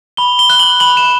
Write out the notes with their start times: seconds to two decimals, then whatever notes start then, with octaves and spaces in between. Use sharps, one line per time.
0.17 B5 G7
0.39 G7
0.50 F#6
0.59 F#7
0.80 B5 F#7
0.97 E7